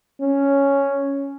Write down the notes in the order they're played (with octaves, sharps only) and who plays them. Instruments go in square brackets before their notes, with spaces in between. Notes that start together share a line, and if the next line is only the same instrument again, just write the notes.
[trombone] C#4